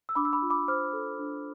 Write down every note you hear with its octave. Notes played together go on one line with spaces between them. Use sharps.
E6
D4 B5 D6
E6
B5 D6
F4
B5 D6
C5 D6 F6
A4
D4